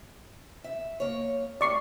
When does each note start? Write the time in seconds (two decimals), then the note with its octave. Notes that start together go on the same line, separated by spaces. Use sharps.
0.64 E5
1.00 A#3 C#5
1.61 A2 G3 D5 C#6 C7